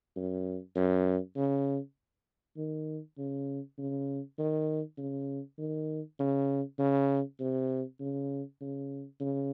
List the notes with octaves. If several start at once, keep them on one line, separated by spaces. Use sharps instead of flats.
F#2
F#2
C#3
D#3
C#3
C#3
D#3
C#3
D#3
C#3
C#3
C3
C#3
C#3
C#3